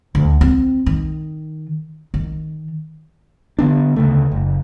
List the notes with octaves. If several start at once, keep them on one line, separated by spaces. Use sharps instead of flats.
D2
C4
D#3
D#3
D3 B3 D4
D2 C#3 A3
F#1